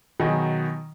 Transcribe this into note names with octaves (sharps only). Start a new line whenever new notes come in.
B2 D#3 F#3 D#4 G#4